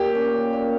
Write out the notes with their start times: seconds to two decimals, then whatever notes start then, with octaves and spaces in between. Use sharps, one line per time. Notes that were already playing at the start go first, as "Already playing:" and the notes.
Already playing: A#2 G4
0.15 C#4
0.53 A#2